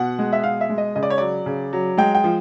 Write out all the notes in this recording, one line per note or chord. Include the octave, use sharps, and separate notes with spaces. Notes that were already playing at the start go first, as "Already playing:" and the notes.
Already playing: B2 F#5
G#3
E5
B2 F5
E5
G#3
D#5
C#3 D#5
D5
C#5
F#3 D5
C#3
F#3
G#3 G5
G5
F3